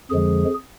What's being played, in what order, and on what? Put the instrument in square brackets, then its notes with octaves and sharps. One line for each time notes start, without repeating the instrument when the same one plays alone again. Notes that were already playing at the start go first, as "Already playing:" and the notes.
[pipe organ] F2 D3 F3 G#3 G#4